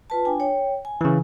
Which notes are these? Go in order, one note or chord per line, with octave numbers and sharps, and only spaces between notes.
F4 B4 A5
D4 G5 G#5
C#5 G5
G#5
C#3 E3